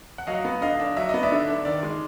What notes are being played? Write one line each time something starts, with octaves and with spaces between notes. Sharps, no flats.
F#5
F#3 D#5 F5
B3
D3 D#5 F5
D4
F#3 E5
B3 D#5
D5 E5
D3
D4
D#3 D5
G#3